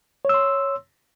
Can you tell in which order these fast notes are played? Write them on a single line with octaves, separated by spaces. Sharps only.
C#5 E6 C6